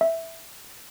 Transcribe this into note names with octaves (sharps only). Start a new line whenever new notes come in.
E5